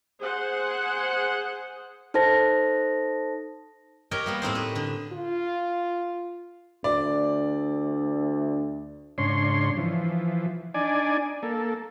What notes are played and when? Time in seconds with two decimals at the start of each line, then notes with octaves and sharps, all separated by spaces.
0.21 G#4 C5 F#5
2.14 D#4 A4 C5 A5 A#6
4.11 G4 A#4 C#5 D#5
4.26 G3 A#3 B3
4.42 A2 C4 D#4 C5
4.55 B4
4.75 D3
5.13 F4
6.84 D2 D5
9.18 G#2 C#3 D4 C#5 C6
9.77 E3 F3
10.74 D4 D#4 D5 G#5
11.43 A#3 A4